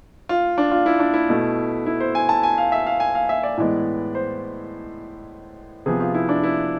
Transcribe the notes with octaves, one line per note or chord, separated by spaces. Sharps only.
F4
D4
F4
E4
D4
E4
B2 A3
E4
C5
G#5
A5
G#5
F5
E5
F5
G#5
F5
E5
D5
A2 E3 G#3 B3
C5
C3 F3 B3 G#4
F4
E4
D4
E4